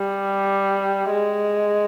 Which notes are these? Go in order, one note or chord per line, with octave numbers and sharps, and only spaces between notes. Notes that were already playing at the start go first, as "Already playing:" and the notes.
Already playing: G3
G#3